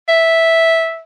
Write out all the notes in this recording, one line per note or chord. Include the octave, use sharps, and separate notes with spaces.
E5